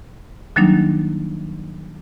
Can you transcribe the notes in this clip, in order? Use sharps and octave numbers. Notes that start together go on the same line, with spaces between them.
D#3 F#3 G3 A#3 D4 D#4